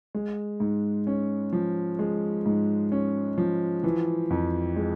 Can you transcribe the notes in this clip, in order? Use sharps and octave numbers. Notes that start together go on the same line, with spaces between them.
G#3
G#2
C#4
F3
G#3
G#2
C#4
F3
E3
F2
G#3